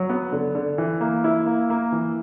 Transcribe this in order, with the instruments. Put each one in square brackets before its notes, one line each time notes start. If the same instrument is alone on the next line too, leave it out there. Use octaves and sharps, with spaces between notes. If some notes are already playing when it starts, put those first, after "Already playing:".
Already playing: [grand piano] F#3
B3
D3
D3
E3
A#3
E4
A#3
A#3
E3